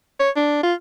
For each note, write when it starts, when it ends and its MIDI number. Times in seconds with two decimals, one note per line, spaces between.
0.20 0.30 73
0.36 0.60 62
0.63 0.74 65